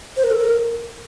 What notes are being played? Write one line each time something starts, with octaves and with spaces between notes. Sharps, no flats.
C5
A#4
A4
A#4